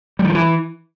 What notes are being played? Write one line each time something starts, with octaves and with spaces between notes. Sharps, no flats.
G3
D#3
F3
E3